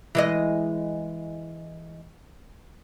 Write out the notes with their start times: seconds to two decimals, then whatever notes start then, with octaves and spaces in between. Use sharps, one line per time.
0.15 E3 G#3 D#5